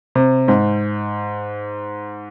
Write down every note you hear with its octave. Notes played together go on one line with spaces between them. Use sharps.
C3
G#2